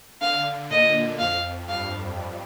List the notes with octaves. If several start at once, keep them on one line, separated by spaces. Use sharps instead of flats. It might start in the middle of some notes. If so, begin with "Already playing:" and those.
D3 F5
A#2 D#5
F2 F5
G2 F5